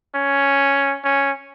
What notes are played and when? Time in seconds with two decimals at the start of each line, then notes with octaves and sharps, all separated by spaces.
0.15 C#4
1.04 C#4